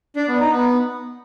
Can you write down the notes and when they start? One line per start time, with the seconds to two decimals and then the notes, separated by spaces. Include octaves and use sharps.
0.16 D4
0.28 B3
0.40 D#4
0.52 B3